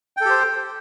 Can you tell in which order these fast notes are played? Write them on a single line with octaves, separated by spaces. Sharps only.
G5 A4 G4 C5